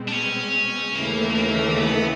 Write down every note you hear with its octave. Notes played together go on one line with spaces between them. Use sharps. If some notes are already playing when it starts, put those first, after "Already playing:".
Already playing: B2 G#3 C4
D4
C#4
D#2 C#3 E3 A3 A#3
A#3
B3